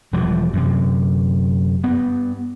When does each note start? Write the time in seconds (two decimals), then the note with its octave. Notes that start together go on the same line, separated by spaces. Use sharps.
0.13 E1 E3 F3 G3
0.53 F#2 C3
1.84 G2 B3